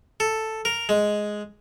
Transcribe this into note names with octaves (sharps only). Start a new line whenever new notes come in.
A4
A#4
G#3